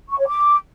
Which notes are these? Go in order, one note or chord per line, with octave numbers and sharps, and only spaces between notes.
C#6
C#5
D6